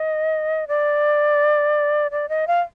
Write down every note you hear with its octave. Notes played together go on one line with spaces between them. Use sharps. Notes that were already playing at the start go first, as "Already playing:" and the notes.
Already playing: D#5
D5
D5
D#5
F5